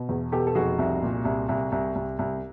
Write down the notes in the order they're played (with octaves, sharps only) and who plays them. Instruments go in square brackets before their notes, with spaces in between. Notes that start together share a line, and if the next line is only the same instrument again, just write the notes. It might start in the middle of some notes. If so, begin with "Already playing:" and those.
Already playing: [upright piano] B2
E2
B2 G4 A4
A4
F1 F#4 G#4
C2
A#2
C2
C2
C2
C2
C2